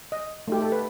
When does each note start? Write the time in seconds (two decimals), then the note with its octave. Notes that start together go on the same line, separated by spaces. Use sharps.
0.12 D#5
0.48 A3 D#4 G4
0.62 A4
0.72 B4